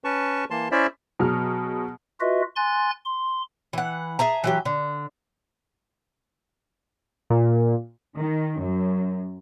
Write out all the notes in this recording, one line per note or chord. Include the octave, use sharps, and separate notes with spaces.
C#4 B4 A5 C#6
E3 A#3 A5 C6
C#4 E4 C5 D5 E5
B2 F#3 G#4 F6
F4 F#4 B4 D#5 E5
G#5 C6 F#6 A6
C6
E3 F#5
G#4 E5 A5 A#5
E3 F#3 G4
D3
A#2
D#3
F#2